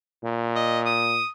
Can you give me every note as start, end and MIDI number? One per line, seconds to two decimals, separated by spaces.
0.24 1.21 46
0.55 0.80 75
0.86 1.28 87